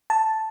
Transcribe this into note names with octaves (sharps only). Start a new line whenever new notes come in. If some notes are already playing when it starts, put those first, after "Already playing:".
A5